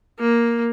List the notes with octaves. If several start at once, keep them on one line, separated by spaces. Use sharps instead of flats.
A#3